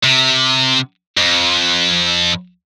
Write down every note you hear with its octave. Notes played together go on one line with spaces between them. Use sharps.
C3
F2